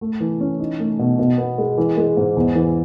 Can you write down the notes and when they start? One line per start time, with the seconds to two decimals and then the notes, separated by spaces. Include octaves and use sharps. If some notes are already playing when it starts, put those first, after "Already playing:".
0.01 A3
0.20 E3
0.40 C#4
0.59 D#4
0.79 A3
0.99 B2
1.19 B2
1.38 B3
1.58 G#3
1.78 E3
1.97 G#3
2.17 G#2
2.36 E2
2.55 E3